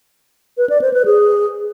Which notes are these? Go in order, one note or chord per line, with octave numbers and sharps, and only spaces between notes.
B4
D5
C5
B4
G#4